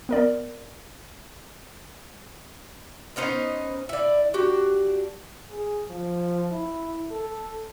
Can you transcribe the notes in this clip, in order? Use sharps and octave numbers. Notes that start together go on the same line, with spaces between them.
B3 A#4 D5
B3 C#4 D#4 C5
E4 D5
D4 F#4 G4
G#4
F3
E4
A4